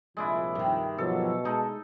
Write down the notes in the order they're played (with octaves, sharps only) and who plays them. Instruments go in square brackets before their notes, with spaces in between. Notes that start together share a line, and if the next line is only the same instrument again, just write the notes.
[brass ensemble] C2 A#2 F3 [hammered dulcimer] G#3 D4 E4
[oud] G2 D#3
[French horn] B2 [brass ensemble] F3 F#3 [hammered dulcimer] A4
[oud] G#3 [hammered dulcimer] D#4 [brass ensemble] A5